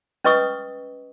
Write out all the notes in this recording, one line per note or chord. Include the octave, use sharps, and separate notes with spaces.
C#4 B4 D#5 C#6 D#6 E6